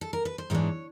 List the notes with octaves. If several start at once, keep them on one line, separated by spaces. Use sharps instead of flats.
A4
A#4
B4
C5
G#2 E3 G#3 B3 D4 C#5